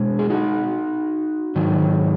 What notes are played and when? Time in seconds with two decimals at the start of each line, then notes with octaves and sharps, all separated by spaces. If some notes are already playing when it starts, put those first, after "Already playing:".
Already playing: B2 G#3
0.19 G#4
0.30 D#4 F#4
1.55 G#2 D#3 F#3